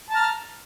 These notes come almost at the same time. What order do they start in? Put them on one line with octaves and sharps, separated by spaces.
A5 A#5 F6